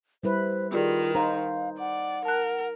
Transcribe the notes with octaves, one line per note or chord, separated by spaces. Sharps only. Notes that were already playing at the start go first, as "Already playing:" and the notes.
G3 E4 B4 C5
D#3 F4 G4 G#4 D5
D#4 C5 F5 A#5
D5 F#5
A#4 A5 F#6